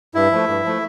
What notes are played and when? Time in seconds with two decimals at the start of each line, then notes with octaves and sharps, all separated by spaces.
0.14 G2 E4 E5
0.32 F3 A3
0.49 G2
0.64 F3 A3